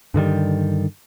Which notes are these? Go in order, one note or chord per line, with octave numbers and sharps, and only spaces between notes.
G2 D3 D#3 G3